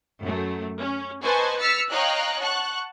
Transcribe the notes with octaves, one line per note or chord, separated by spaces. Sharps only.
F#2 A3
C#4
B4 C5 D#5 G#5 A5 C#6
E6 F6 A6 B6 C#7
C#5 D#5 F5 G5 A#5 F#6
F#5 A5 C#6 F#6